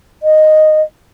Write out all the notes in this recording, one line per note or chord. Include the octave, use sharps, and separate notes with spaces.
D#5